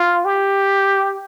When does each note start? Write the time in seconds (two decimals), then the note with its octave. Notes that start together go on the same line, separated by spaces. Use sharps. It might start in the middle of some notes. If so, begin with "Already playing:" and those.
Already playing: F4
0.25 G4